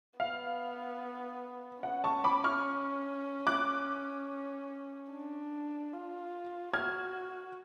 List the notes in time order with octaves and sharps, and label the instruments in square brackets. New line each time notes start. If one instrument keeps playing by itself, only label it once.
[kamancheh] B3 [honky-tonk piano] F5
[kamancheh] C#4 [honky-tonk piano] F#5
[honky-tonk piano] A5 C#6
B5 D6
C#6 F6
D6 F#6
[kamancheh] D4
F4
[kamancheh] F#4 [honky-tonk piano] F6 G#6